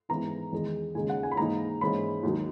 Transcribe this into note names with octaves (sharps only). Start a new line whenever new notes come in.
G#2 E3 B3 E4 A#5
E2 D#3 G#3 D#4
D#2 C#3 G#3 D#4 G#5
F#5
G#5
B5
G#2 E3 A#3 D#4 A#5
G#2 E3 A#3 C#4 B5
D#2 D#3 F#3